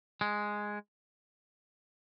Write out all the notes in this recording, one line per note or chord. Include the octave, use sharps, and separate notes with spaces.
G#3